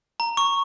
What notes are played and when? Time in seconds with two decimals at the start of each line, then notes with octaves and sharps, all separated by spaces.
0.20 A#5
0.37 C#6